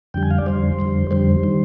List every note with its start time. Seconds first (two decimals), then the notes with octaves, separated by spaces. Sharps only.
0.14 F2 D3 G3 G5
0.23 G#5
0.31 F5
0.38 D5
0.46 F2 D3 G3 C5
0.79 F2 D3 G3
1.11 F2 D3 G3 C5
1.43 D#3 G3